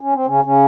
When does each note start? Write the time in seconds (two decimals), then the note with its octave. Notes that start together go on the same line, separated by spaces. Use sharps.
0.01 C#4
0.14 C4
0.26 C#3 C#4
0.44 C#3 C#4